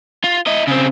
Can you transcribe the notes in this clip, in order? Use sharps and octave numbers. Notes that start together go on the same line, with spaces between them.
F4
E4 D#5
C#3 C4